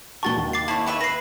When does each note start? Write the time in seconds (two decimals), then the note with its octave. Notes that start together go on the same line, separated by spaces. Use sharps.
0.23 A#2 F#4 A5 C#6 A6 G7
0.36 D#2
0.53 D6 A6 C7
0.68 E4 C#5 A5
0.86 B4 E5 C#6
1.01 B4 A#6 C7